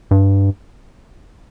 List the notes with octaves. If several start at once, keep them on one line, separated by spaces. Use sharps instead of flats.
G2